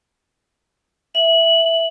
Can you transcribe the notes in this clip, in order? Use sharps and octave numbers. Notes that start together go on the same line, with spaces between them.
E5 F#7